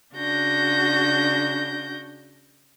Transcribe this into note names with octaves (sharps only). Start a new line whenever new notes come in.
C#3 D4 F#4 G6 A#6